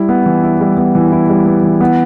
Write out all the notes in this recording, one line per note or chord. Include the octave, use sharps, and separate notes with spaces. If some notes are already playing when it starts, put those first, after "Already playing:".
Already playing: G3 E4
B3
E3
E4
G3
B3
E3
E4
G3
B3
E3
B3